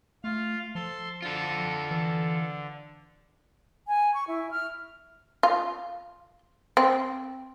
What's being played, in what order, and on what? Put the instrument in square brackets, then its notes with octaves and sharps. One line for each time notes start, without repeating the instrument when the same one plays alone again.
[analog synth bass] A3 [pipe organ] F4 F5
[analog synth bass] F3 [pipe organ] A4 C6
[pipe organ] D3 [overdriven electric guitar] F4 A4
[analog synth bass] E3
[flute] G#5
C#6
E4
F6
[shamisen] F4
C4